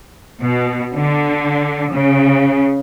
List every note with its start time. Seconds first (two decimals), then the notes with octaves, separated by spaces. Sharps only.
0.42 B2
0.94 D3
1.91 C#3